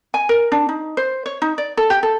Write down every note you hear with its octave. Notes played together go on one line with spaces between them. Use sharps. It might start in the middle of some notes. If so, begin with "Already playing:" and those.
G#5
A#4
D4
D#4
C5
C#5
D#4
D5
A4
G4
A4